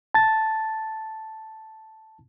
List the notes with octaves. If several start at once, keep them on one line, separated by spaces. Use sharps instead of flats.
A5 A6